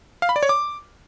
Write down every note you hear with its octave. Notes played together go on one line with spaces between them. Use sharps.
F5
B5
D5
C#5
D6